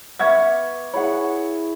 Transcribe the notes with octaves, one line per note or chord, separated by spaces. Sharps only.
B3 E5 F#5 C#6 D6 F6 G#6
E4 G#4 C#5 F#5 B5 C#6